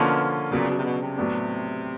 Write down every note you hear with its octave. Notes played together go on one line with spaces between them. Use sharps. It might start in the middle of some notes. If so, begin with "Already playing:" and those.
Already playing: B2 D3 F3 A#3 C#4 F4
A#2 C#3 F#3 B3 D4
B2
C3
B2
C3
A2 F#3 B3 D4